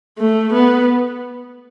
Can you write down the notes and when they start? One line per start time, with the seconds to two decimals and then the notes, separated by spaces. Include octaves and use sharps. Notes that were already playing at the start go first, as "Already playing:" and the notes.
0.18 A3
0.53 B3